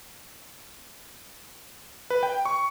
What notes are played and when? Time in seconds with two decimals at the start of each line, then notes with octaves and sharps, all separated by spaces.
2.10 B4
2.23 G5
2.45 C#6